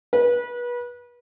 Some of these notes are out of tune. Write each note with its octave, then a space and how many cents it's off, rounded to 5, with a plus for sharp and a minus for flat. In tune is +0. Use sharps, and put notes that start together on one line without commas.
B4 -30